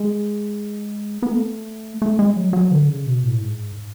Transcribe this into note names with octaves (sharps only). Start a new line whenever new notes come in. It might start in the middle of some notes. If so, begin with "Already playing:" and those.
Already playing: G#3
B3
A3
A3
G#3
F#3
F#3
D3
C#3
B2
A2
G#2